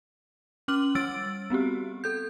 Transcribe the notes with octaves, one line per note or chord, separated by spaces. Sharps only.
C#4 D6 F6 F#7
G3 E6 A6 D7
B3 C4 F#4 G4
A4 G6